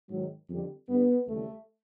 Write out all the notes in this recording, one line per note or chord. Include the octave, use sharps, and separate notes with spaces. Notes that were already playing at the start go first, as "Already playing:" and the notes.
G#2 D#3 F#3
F2 D3 G3
G2 D3 G3 B3
D#2 C#3 E3 G3 A3